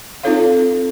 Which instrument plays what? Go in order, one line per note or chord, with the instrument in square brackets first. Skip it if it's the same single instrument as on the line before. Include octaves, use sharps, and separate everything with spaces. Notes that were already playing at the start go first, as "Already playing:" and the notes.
[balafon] C4 D#4 F4 A4 C#5 F5